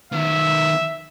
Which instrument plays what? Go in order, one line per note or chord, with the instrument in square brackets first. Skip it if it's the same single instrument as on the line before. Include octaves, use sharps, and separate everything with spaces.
[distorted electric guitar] D#3 B3 [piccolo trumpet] E5